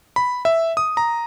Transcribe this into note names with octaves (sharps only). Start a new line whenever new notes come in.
B5
E5
D#6
A#5